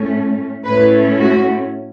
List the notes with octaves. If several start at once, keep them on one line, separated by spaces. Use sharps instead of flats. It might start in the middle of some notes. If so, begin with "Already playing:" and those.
Already playing: A2 A3 C#4
A2 A3 C#4 E4 B4
F#4